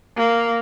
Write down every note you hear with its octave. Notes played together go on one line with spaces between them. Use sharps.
A#3